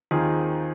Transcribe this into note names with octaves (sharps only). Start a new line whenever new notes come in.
D#2 D#3 C4 F4 G#4